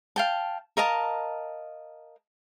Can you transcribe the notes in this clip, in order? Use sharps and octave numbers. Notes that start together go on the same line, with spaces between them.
F5 G5 A5
A#4 D#5 F5 A5